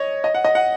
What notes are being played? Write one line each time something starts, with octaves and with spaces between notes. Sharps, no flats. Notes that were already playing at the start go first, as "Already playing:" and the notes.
Already playing: C#5 D#5
D#5
F#5
D#5
F#5